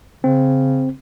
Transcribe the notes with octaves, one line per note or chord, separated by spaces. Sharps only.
C#3 C4